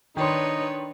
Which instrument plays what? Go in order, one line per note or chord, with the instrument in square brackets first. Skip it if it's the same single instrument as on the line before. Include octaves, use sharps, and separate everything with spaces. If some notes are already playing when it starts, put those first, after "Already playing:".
[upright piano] D#3 C6 [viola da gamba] D4 B4 C#5 [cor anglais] D#4